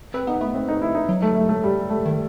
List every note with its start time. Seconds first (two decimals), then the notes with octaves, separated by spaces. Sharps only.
0.14 C4 B4
0.27 B3 D#4
0.41 A3 B3
0.54 C4
0.68 D#4
0.82 E4
0.95 D#4
1.09 F#3
1.22 A3
1.35 A3
1.49 A3
1.64 G3
1.90 A3
2.05 D#3